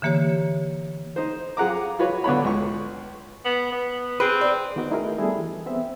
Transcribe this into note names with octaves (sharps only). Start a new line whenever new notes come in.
D3 E3 A#3 G4 C#5
D#4 C5
F4 G#4 F#5 A#5 D6
F4 F#4 B4 C#5
D3 B3 C#5 B5
C#2 C#6
B3
B3
C4 G#4 B4
D5
D#3 B3 D#4 F#4 B4 D#5
A3 D#4 E4 F#4 G#4 A#4
G3 B3 D4 E4 G#4 A4
E3
B3 C4 E5